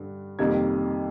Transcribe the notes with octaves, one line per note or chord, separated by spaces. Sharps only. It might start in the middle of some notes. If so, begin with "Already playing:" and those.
Already playing: G2 D3
F2 C3 D#3 G3 A#3 G#6